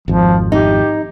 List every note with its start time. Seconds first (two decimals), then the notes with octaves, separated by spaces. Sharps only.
0.08 G#1 F2 F3
0.52 D#4 G4